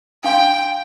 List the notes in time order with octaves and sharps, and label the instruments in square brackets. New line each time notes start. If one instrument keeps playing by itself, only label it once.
[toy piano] D4 F5 C6 [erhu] G5